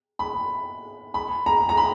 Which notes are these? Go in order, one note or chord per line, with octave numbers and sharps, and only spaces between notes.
B5
B5
A#5
A#5
B5